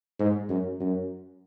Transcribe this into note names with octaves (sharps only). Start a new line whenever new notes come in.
G#2
F#2
F#2